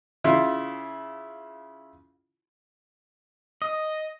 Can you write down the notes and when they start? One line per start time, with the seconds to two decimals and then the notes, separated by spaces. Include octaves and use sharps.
0.24 C#3 E4 F4
3.62 D#5